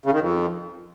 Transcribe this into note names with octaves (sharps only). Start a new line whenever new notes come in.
C#3
D#3
F2